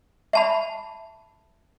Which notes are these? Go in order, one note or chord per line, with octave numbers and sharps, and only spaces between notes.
E5 A5 B5